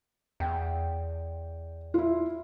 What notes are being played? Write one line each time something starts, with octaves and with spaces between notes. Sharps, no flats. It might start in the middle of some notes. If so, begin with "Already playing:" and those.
E2 G5
E4 F4